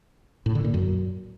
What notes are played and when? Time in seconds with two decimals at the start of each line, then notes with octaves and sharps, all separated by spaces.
0.46 A2
0.55 D3
0.64 A#2
0.74 F#2